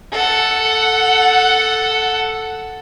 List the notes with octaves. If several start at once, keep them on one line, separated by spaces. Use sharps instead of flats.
A4 F#5